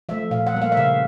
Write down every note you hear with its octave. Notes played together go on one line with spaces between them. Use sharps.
F3 A3 E5
A#2 F5
F#5
G3 A#3
F5
E5
C#3 F5